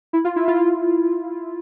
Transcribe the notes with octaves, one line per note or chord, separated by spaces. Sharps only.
E4
F4
E4
F4